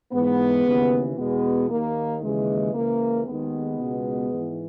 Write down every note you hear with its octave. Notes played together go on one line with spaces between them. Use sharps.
G#2 E3 G#3 B3
D#2 C#3 E3
E2 B2 G#3 B3
D#2 D#3 A#3
D#2 C#3 E3 G#3
C#2 C#3 E3 A#3
D#2 D#3 G#3 B3
C#2 B2
G#2 E3